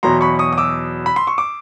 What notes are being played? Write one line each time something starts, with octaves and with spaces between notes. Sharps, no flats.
E2 B2 F#3 A#5 C6
B5 C#6
C#6 D#6
D#6
D6 E6
B5
C6
C#6
D6